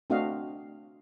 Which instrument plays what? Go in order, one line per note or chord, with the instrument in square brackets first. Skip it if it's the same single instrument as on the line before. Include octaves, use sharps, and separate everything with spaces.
[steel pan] A3 C4 D4 F#4 D#5 F5